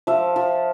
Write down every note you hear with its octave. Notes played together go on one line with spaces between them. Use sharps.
F3 E5
F3